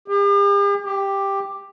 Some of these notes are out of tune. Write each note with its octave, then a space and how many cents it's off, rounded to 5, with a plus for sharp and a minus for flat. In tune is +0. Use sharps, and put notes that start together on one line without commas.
G4 +45
G4 +5